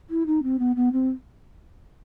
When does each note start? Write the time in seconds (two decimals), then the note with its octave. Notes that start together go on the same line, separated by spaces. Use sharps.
0.09 E4
0.26 D#4
0.42 C4
0.59 B3
0.75 B3
0.92 C4